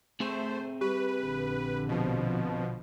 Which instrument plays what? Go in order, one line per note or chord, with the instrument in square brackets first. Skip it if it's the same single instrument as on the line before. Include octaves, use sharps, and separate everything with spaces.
[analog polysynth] A3 C5 [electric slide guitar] C4 G#4 E5
[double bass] G3 [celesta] G4 [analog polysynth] B4
[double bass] A#1 D3
[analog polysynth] B2 F3